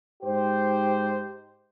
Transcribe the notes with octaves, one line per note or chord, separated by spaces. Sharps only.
G#2 D#4 G4 C5